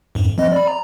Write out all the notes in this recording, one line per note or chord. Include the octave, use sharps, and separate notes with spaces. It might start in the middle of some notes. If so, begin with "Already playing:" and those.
F2 G#2
F3 C4 D#5
D5 B5
A#5